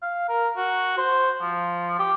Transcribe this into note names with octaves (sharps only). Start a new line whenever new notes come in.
F5
A#4
F#4
C5
F3
G4